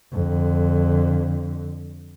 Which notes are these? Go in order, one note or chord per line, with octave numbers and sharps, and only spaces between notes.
F2 D3